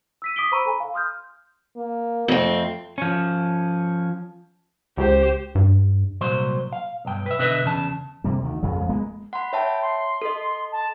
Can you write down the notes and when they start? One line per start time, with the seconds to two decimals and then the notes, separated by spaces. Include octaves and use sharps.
0.22 E6 B6 D#7
0.36 D6 D#6 B6 D7 G7
0.52 C5 A#5 B5 C#6 E6 D#7
0.66 A4 G#5
0.80 F5
0.94 C6 D#6 F6 G6
1.77 A#3
2.28 F2 A3 C4
2.98 F3 C#4
4.98 C#2 G4 C5
5.55 G2
6.21 C2 A#2 F#3 C5
6.72 F5
7.05 B1 G2 G5
7.26 B4 E5
7.39 B2 D3 B4 D#5 E5
7.64 E2 C#3 A5
8.24 C3 G3 A#3
8.43 D2 D#3
8.63 A#1 F2 C#3 F#3
8.77 F2 F3 G#3
8.89 G#3 A#3 B3
9.33 F#5 B5 C6
9.53 C#5 E5 G5 A5
9.81 C6
10.22 A4 D#5
10.71 A5